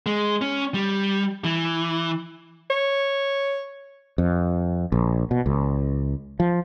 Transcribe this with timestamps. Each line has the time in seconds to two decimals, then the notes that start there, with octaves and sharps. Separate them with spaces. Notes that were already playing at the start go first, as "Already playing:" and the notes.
0.06 G#3
0.41 C#4
0.74 G3
1.44 E3
2.70 C#5
4.18 F2
4.92 A#1
5.31 B2
5.46 C#2
6.40 F3